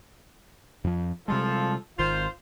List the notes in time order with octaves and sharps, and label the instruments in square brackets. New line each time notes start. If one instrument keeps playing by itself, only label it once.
[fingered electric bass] F2 F3
[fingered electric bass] C3 G3 G#3 [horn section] F3 F4 A4
[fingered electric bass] G#1 D#3 [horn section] F4 C5